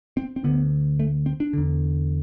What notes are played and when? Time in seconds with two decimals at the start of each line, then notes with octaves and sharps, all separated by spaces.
0.17 C4
0.36 C4
0.44 D2 D3 B3
0.99 A3
1.26 C4
1.40 D4
1.53 E2 D3